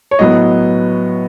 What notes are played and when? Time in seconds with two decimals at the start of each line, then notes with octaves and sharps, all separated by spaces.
0.11 C#5
0.19 A2 F#3 B3 D#5